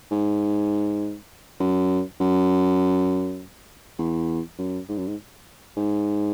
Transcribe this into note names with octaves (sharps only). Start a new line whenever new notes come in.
G#2
F#2
F#2
E2
F#2
G#2
F#2
G#2
G#2